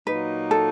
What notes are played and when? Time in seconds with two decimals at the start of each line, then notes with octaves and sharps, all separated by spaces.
0.07 A#2 F#3 A#3 D#4 B4
0.51 A4